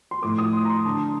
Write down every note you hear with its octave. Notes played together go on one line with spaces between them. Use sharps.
C6
A2 F3 A3 D6
D#6
C6
A#5
C6
D3 A3 A5